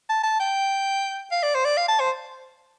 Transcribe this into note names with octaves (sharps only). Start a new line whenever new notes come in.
A5
A5
G5
F5
D5
C5
D5
F5
A5
C5